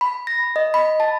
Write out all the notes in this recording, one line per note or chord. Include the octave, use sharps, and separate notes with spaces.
B5
A#6
D#5
B5
A5